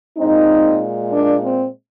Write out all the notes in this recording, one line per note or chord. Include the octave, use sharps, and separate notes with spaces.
A#2 G#3 C4 D#4
A#3 D4
C4